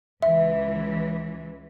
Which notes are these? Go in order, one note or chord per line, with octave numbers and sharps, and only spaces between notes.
C#2 E3 E5